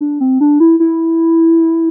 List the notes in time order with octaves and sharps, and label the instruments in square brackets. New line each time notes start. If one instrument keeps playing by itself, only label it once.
[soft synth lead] D4
C4
D4
E4
E4